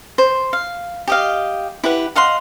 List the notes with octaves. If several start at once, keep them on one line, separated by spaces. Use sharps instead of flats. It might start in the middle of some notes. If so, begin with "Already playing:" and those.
C5
F5
G4 D#5 F5
E4 G4 B4 F#5
D#5 F5 F#5 C6